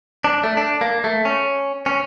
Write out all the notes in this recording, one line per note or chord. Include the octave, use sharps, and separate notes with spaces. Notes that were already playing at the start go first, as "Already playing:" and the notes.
D4
A3
D4
A#3
A3
C#4
C#4